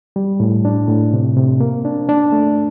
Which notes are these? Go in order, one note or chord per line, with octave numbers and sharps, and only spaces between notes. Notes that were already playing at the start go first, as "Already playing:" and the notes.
G3
A2
D4
A2
C3
C3
A#3
D4
D4
A3